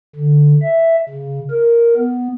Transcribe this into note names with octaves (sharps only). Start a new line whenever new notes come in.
D3
E5
C#3
A#4
B3